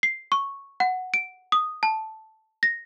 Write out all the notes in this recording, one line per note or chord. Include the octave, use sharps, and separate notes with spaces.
C7
C#6
F#5
D7
D#6
A5
A#6